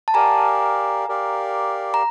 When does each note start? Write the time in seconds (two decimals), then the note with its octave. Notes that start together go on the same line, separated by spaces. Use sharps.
0.08 A5
0.14 G4 A#4 D5 F5 G#5 A#5
1.08 G4 A#4 D5 F5
1.94 A#5